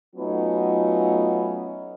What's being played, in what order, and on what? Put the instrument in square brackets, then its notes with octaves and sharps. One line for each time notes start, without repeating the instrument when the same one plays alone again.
[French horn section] F#3 A3 B3 C#4 D#4 F4